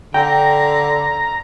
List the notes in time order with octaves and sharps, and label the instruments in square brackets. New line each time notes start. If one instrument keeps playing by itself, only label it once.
[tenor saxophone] D3 [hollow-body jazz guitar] G5 [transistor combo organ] A#5